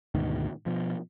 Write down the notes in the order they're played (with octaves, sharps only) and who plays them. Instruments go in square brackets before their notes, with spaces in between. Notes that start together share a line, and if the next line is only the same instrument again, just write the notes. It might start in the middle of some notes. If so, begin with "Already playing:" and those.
[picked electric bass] D2 G#2 B2 D#3
B2 F3